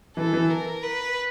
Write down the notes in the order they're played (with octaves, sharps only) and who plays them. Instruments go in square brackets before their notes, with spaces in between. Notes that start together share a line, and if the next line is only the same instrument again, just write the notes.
[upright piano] E3 [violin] A4
[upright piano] E3
[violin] A#4
B4